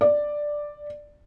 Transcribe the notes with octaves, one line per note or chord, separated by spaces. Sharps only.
D5